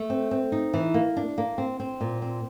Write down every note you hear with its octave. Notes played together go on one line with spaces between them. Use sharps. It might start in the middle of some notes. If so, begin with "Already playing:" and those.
Already playing: A3
C4
C4
D#4
E3
A#3
D4
A#3
C4
C4
A#2
C4